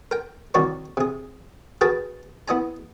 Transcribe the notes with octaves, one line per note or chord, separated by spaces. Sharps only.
A#4 G5
C2 D#3 F#4 C#5 D5 C#6
C3 G#4
F#4 G#4 A#4 B4 G5 A5
B3 E4 D#5 G#5 A#5